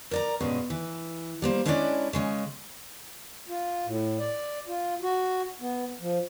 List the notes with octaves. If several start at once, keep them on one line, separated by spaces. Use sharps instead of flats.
A#4 D5 A#5
G2 B2 G#3 C#4
E3
G3 A#3 C5
G#3 C#4 D4 E4 C#5 D5
C#3 G#3 C#4
F4
A2
D5
F4
F#4
B3
F3